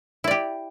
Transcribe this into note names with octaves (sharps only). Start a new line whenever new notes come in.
E4 G4 D5